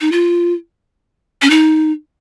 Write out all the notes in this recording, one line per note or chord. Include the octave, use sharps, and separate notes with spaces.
D#4
F4
C#4
D#4